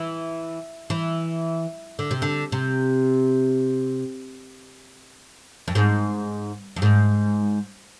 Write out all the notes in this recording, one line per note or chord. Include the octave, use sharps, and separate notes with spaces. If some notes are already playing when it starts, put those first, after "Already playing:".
Already playing: E3
E3
D3
C3
D3
C3
F2
G#2
F2
G#2